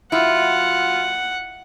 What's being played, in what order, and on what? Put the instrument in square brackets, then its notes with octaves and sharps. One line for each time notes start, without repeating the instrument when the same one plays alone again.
[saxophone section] F#3 F4 [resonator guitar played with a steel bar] E4 [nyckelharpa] F#5